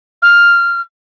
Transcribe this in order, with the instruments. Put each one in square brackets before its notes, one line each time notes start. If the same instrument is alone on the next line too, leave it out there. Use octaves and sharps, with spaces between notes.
[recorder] F6